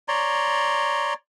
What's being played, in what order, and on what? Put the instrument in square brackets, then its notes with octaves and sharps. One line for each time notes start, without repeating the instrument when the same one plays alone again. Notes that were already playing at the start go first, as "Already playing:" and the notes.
[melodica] C#5 D5 A#5 C6